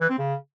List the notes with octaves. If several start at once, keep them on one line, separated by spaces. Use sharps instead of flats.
E3
C4
C#3